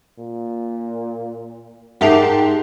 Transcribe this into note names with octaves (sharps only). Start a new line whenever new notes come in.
A#2
G#2 G4 G#4 A#4 E5 F#5 A5 C7